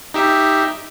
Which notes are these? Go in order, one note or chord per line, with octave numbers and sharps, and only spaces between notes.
D#4 G4 E5